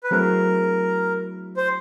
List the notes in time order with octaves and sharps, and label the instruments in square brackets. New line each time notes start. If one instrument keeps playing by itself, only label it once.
[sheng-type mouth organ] B4
[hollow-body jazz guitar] F#3 A3 C4 E4 G#4 [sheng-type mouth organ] A#4
[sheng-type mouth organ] C5